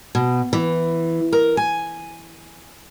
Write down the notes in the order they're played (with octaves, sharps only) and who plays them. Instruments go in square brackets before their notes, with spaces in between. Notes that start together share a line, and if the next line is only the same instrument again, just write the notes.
[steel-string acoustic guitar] B2
E3
A#4
G#5